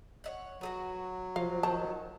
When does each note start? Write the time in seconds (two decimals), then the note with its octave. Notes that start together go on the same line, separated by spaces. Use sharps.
0.24 C#5 E5 F#5
0.61 F#3 F#4 G#4 B4
1.36 C3 F3 F5
1.63 D#3 A5